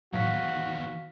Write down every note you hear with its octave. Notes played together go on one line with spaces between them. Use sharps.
E2 A2 D#3 F#3 F#4 F5 B6